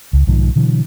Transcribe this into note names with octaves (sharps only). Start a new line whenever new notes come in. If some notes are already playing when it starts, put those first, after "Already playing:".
C#2
B1 G#2 D#3 F3
B2 D3 E3 F#3